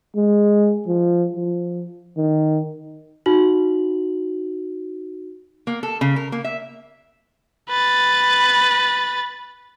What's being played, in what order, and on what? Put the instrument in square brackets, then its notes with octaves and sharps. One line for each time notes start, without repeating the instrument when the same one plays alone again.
[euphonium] G#3
F3
F3
D#3
[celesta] D#4 F#4 F#7
[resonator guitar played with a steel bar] A#3
A4
C#3
A#4
A#3
E5
[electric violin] B4 A6